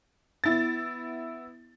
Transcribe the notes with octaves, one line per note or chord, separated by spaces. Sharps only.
B3 E4 A6